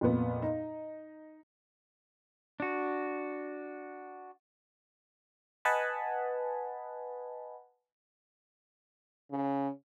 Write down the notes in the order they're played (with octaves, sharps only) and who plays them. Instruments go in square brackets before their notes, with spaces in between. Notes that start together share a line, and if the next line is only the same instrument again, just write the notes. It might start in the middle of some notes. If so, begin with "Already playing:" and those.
[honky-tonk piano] F2 A#2 B3
D#4
[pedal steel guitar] D4 F#4
[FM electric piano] B4 D#5 F#5 G#5 A5 B5
[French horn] C#3